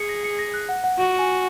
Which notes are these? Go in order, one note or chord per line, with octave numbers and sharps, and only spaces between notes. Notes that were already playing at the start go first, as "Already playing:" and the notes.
Already playing: G#4 C#7
A#6
C#7
A#6
F#6
F#5
F#5
F#4 F#5
G#5